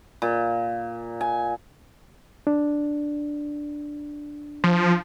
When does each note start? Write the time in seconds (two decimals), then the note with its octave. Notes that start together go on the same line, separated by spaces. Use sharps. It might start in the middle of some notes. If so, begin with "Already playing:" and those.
0.22 A#2
1.21 G#5
2.47 D4
4.64 F3